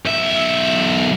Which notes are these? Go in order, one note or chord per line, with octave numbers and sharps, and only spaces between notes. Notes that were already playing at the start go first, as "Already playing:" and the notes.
B1 E5